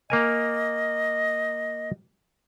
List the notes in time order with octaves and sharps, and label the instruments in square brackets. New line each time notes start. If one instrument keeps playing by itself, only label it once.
[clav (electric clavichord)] A#3 A#4 G#5 [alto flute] D#5